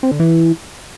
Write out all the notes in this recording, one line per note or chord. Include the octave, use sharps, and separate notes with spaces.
C4
D3
E3